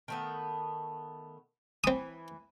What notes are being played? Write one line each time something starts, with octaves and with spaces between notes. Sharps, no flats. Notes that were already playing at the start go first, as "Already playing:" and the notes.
D#3 A3 B3
E3 C4 D#6